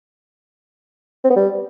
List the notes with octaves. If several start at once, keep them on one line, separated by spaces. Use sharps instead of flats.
C4
B3
G3